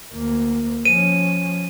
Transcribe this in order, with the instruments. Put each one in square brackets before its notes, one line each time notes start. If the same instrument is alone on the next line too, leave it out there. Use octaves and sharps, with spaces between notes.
[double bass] D2 A#3
[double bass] F3 C#4 [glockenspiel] D#7